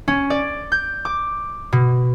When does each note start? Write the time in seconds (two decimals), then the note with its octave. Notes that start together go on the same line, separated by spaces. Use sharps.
0.08 C#4
0.30 D5
0.72 G6
1.05 D6
1.72 B2